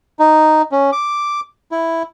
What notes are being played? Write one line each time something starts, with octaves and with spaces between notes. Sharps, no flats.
D#4
C#4
D6
E4